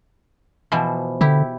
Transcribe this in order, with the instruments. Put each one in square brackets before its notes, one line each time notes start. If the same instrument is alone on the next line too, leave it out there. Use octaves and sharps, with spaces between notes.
[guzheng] B2 E3 F3
[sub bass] D3 [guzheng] E4 G4